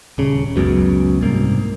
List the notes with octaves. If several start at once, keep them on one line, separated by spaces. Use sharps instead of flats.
D#1 C#3
F#1 C#2 F#2 B2
C2 G#2 A#3